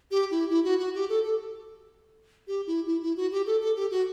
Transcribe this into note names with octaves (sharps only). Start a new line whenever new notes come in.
G4
E4
E4
F#4
F#4
G4
A4
A4
G4
E4
E4
E4
F#4
G4
A4
A4
G4
F#4